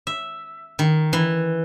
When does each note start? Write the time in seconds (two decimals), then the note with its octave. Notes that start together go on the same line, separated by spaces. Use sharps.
0.07 E5
0.79 D#3
1.13 E3